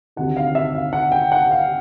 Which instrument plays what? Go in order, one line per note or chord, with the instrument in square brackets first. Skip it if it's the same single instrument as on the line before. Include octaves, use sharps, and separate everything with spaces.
[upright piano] D2 C3 D#3 F#5
F5
E5
F5
F#5
G5
F#5
F5